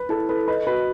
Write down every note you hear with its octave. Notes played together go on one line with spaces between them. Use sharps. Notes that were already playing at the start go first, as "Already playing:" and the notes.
Already playing: B4
E4 A4
A4 B4
B4 D#5
F#4 B4